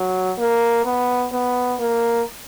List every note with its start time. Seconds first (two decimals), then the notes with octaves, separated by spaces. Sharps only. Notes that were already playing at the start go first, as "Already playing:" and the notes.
Already playing: F#3
0.38 A#3
0.85 B3
1.32 B3
1.79 A#3